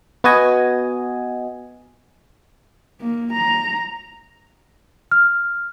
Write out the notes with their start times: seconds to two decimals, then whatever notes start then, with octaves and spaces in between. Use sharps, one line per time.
0.24 B3 F#4 D#5 G#5
3.01 A#3
3.33 A#5
5.11 F6